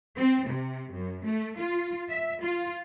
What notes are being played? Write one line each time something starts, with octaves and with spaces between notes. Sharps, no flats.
C4
C3
F#2
A3
F4
E5
F4